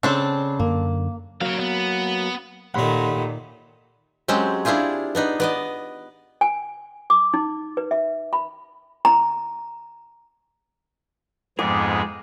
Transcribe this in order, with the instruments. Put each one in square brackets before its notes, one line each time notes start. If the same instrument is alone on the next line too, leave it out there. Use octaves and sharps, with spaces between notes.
[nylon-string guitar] C#3 [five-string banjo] C4 D4 A4
[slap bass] F#2 D3 [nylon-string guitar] A#3
[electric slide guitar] F#3 A#3 [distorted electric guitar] C#5 F5
[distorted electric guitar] B3
[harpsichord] D#2 A3 [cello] A#2 D#3 [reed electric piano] F#5 B5 C6
[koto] F#3 G#3 C4 C#4 G4
D4 E4 F4 G4 G#4
B3 D4 D#4 B4
B3 D5 D#5
[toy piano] G#5
D6
D#4
B4
E5
B5
A#5
[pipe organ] F2 G#2 B3 [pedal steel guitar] G#4 [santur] D#5 D6